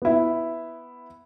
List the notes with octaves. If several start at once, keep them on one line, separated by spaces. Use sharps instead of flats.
B3 E4